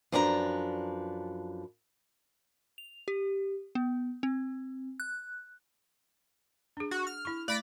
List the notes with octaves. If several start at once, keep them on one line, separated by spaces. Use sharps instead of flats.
F#2 F3 D4 B4 G#5 A#5
F7
G4
B3
C4
F#6
D4 G#4
F#4
F6
E4 C#6
A3 D5 B5 A#6